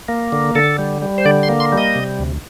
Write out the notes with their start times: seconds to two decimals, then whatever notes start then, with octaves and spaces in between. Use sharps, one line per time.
0.08 A#3
0.32 D3
0.55 D3 A4
0.79 G3
1.02 G3
1.18 C5
1.25 D3 D5
1.43 C6
1.49 A#3
1.60 C6
1.72 G3
1.78 D#5
1.95 C3
2.19 D2